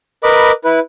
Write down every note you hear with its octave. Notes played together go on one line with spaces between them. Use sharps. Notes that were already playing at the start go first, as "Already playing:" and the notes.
A#4 B4 D#5 B5 D6
E4 B4